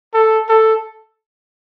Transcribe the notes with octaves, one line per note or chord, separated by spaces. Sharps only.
A4
A4